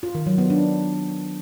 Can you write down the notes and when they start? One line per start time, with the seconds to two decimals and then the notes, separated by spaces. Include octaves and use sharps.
0.03 F4
0.15 D#3
0.26 F#3
0.38 B3
0.50 D4